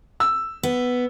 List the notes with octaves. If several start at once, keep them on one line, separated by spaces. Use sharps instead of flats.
E6
B3